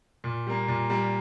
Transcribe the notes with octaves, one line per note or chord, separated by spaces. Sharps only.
A#2
G3 A#3
A#2
G3 A#3